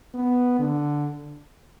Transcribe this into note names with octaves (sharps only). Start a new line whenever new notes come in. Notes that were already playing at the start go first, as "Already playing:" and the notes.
B3
D3